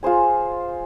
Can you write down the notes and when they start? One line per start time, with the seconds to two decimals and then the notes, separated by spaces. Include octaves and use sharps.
0.03 F4 G#4 C5 G#5